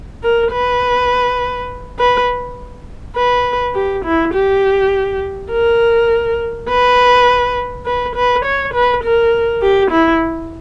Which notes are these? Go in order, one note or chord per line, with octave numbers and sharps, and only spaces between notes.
A#4
B4
B4
B4
G4
E4
G4
A#4
B4
B4
B4
C#5
B4
A#4
G4
E4